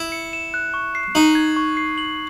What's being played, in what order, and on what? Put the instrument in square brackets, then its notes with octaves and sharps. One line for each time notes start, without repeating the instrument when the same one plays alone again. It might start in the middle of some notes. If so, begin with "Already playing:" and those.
Already playing: [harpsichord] E4
[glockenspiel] C#7
E7
F#6
C#6
C7
[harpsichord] D#4 [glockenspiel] F#7
[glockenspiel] G#6
C#6
C7
F#7